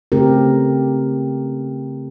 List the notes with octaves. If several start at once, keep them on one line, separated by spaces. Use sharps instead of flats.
C#3 A3 C4 G4 A#4